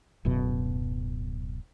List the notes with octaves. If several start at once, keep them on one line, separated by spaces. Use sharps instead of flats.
D1 F#2 B2